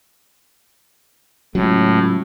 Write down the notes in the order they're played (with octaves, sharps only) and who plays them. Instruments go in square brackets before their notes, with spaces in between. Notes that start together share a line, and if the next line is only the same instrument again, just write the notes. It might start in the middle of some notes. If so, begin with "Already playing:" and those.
[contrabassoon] C#2 [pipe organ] A2 [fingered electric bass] F#3